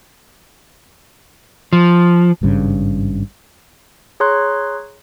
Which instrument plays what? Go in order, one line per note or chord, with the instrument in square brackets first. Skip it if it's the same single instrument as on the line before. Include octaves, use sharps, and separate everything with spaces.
[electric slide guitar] F3
[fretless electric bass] G#1 G2 C#3
[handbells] G#4 C#5 A#5 C6 F#6